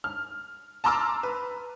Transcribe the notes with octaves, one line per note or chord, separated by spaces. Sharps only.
F6
A5 A#5 C6 D6 E6 F6
B4